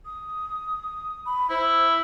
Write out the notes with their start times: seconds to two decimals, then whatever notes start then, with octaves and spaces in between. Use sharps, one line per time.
0.05 D#6
1.26 B5
1.50 E4 C5